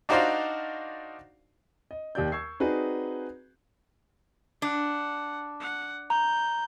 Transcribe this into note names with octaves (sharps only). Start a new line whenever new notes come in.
D4 D#4 F#4 C5 D5 F5
D#5
D#2 G4 D5 G6
C#6 E6 G#6 C7
C4 D#4 F#4 G#4 B4 D5
D4 F#5
F#5
A#5 G6